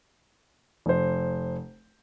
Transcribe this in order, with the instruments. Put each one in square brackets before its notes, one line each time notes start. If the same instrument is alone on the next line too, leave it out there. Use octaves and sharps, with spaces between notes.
[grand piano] F1 C5